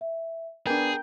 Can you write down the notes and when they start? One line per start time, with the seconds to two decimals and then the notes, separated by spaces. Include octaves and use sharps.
0.01 E5
0.67 B3 D4 G#4 A#4 G5 A#5 G6